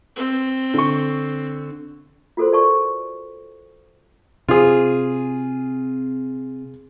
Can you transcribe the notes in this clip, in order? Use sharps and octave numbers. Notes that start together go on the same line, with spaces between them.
C4
D3 C#6
F4 F#4 A4 A#4 C5 C6
D5 A5 C#6
C3 F4 G#4